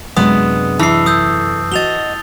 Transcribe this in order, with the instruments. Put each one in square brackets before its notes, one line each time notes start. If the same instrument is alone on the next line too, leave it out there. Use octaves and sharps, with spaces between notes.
[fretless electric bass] F#2 C3 F#3 [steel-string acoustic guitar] G#3 D4 [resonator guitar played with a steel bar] B3 [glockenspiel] D#6
[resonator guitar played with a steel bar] E3 [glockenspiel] A5 C7
[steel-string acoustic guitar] A4 [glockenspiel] D#6 E6 G6
[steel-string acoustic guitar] F#4 D#5 [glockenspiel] A6 F7 G7